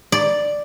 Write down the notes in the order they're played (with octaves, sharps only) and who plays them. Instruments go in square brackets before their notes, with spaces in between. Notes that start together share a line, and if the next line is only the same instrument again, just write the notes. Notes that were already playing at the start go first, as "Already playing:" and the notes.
[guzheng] D5